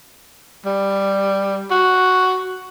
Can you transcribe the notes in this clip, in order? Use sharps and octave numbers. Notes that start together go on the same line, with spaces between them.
G3
F#4